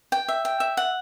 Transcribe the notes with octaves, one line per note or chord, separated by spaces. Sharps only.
G5
E5
G5
E5
F#5